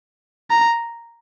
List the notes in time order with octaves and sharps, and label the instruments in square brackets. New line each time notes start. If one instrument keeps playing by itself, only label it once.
[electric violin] A#5